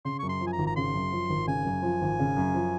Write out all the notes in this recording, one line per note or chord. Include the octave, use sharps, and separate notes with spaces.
C#3 C6
F#2 C#6
C6
F3
G#5
A#5
G#1
A#5
C#3 C6
F#2
F3
G#1
C#3 G#5
F#2
F3
G#1
C#3
F#2
F3